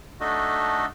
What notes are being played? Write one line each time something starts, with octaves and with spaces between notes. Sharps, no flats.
A3 D4 D#4 F#4 A4 D#5